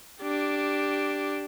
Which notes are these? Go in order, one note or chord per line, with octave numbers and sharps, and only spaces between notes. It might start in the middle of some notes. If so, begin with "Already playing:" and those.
D4 G4